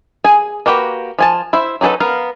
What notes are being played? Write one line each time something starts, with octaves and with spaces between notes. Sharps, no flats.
G#4 G#5
A#3 F#4 G4 B4
F3 G#5 A5
E4 C5 E5
F#3 D#4 G#4 A4 B4
B3 A#4 F5